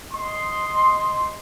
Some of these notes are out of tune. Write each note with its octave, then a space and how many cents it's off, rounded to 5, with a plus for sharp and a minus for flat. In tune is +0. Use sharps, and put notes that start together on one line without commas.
D#5 +0 C6 +0